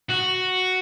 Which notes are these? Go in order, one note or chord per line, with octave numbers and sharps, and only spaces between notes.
F#4